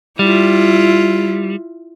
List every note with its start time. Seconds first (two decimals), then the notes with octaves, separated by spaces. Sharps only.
0.19 G3 E4 F4